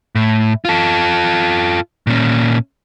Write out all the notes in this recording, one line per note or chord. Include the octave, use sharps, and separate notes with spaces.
A2
F4 A4
A#2 C#4